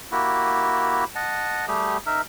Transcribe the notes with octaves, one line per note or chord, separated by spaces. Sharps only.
A#3 E4 F#4 G4
D#5 F#5 A5
G3 A3 G4 G#4
D#4 A#4 E5